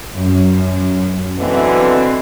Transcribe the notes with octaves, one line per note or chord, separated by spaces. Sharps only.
F#2
B2 D3 E3 C4